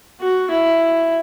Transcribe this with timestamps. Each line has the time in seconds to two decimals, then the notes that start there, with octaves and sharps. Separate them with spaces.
0.21 F#4
0.51 E4